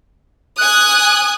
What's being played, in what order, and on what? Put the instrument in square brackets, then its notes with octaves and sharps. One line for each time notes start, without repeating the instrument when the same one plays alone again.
[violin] G#5 D#6 [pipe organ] F#6